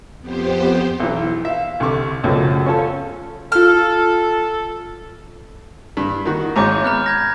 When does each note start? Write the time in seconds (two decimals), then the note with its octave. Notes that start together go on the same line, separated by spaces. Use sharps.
0.20 F2 B3 G4 C5
1.00 B1 E3
1.45 E5 F5
1.80 C2 D3 C#6 D6
2.24 C#2 F#2 B2 F3 F#3 A3
2.66 C#4 F4 A4 C#5
3.52 F4 A4 E6 F6
5.97 G2
6.25 D#3 F#4
6.56 G#1 G#2 C#4 A#5 D6 G6
6.84 B3 A#5 F6 F#6
7.06 G6 G#6 A#6